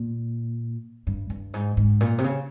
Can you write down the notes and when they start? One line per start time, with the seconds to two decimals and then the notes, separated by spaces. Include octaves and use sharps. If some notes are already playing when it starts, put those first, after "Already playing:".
Already playing: A#2
1.07 G2
1.30 G2
1.54 G#2
1.77 G#2
2.01 A#2
2.18 C3
2.24 C#3